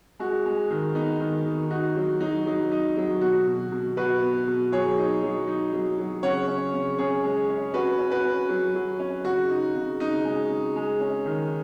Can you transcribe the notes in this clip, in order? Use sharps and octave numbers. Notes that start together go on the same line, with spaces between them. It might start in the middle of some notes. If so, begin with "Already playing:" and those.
G#3 F#4
G#3
D#3
B3 D#4
D#3
D#3
D#4 F#4
F#3
F#3 D#4
F#3 D#4
D#4
F#3
B2 F#4
B2
B2
B2 F#4 B4
B3
B2
F#3 G#4 C#5
D#4
F#3
D#4
F#3
F#3
C#3 C#5 F#5
C#4
C#3
C#3 G#4 C#5
G#3
C#4
C#4 F#4 B4
C#4
F#4 B4
C#4
F#3
F#3
C#4
C#3 F#4
D#4
C#3
C#3 D#4
G#3
C#3
G#3
C#4
D#3